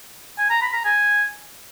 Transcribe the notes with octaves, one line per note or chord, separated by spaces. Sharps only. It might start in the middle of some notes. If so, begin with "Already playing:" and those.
G#5
A#5
B5
A#5
G#5